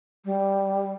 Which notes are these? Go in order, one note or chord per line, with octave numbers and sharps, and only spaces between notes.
G3